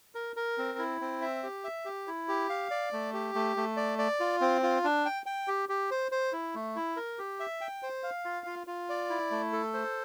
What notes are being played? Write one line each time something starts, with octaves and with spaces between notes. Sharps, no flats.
A#4
A#4
C4
E4
C4
E5
G4
E5
G4
E4
G4
F5
D5
A3
G4
A3
A3
D5
D5
F4
C4
F4
D4
G5
G5
G4
G4
C5
C5
E4
A3
E4
A#4
G4
E5
G5
C5
F5
F4
F4
F4
D5
E4
A3
A4
C5